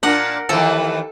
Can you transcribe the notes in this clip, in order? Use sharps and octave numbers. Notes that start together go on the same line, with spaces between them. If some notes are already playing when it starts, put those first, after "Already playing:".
A#2 D4 A#4 F#5
D#2 E3 F3 A4